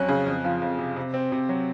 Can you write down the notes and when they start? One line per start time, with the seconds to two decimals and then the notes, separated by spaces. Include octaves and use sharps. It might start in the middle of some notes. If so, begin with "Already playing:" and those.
Already playing: F2 F#3 C#4 F#6
0.08 C#3
0.26 F2
0.44 F3
0.62 F2
0.79 C3
0.96 C3
1.14 C4
1.32 C3
1.49 F#3